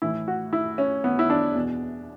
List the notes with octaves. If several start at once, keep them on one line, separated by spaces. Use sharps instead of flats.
A2 E3 E4
F#4
E4
C#4
B3
E4
D4
E2 B2